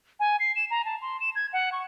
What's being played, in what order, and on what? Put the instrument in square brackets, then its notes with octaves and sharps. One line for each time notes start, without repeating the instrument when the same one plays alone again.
[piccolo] G#5
C7
E7
A#5
A5
C6
E7
G#6
F#5
C#6